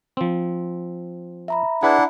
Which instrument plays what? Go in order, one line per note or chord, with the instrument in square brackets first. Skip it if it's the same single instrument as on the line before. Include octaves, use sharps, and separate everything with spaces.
[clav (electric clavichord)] F3 C4
[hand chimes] E5 A#5 B5
[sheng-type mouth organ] D4 E4 F#5 [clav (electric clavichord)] G#4 B4 G#5